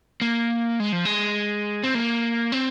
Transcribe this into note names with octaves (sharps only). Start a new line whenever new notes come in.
A#3
G#3
F3
G#3
C4
A#3
C4